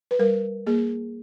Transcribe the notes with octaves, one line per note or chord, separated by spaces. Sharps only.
B4
G3 A#4
A#3 G#4